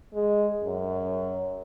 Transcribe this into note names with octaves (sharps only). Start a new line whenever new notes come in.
G#3
F#2